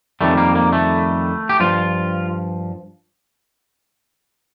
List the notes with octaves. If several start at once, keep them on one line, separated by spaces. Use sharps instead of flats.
F2 D#3 G3 A3
A#3
A#3
A3
G4
G2 F3 F4